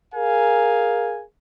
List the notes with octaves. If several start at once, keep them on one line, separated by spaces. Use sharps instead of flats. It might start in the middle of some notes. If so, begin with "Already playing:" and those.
G#4 A#4 F5 G#5